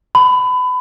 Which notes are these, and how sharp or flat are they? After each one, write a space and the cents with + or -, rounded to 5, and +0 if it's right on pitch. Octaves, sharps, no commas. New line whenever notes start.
B5 +25